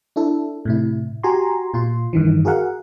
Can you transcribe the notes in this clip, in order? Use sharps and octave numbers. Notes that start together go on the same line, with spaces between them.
D4 E4 A4
A2 C3 E4
F#4 G4 G#5 A#5 C6
A#2 F4 C6
G2 D#3 E3
F#4 G#4 A#4 F5 F#5